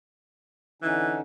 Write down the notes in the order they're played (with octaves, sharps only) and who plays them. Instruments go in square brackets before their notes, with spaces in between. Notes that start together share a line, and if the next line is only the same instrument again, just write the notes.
[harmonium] D3 C#4 D#4 [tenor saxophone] E3